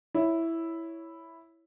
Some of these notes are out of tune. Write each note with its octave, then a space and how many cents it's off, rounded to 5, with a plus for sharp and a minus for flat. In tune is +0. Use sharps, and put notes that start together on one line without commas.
E4 +0 C#5 +5